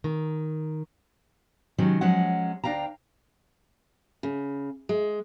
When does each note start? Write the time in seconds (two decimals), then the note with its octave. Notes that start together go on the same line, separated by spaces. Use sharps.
0.04 D#3
1.78 C3 D#3 F#3 G#3 C#4
2.01 F3 F#3 G#3 C#4 F#5
2.64 D2 D4 F5 G5 A#5
4.23 C#3
4.89 G#3